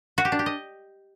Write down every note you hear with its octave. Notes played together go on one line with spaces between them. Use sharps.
F#4
G4
D4
G4
D#5